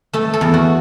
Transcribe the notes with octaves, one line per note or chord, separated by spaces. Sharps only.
A3 A4
A4
E2
F#4